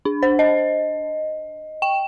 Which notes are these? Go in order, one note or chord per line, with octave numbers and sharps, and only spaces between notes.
D4
C5
D#5
G5